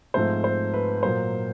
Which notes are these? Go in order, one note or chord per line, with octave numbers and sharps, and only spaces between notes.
G#2 F3 A3 C4 C5
C5
B4
A#2 F#3 A#3 C5